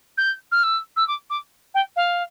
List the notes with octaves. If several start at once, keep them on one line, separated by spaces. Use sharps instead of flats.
G6
F6
E6
E6
D6
D6
G5
F5